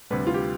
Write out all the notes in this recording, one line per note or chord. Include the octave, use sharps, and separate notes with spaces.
D2 C3 G3 B4
F4
G4